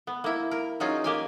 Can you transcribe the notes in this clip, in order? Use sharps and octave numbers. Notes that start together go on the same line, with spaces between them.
B3
A#3 E4
A#4
F#3 C#4 D#4 F4 G#4
A#3 G4 G#5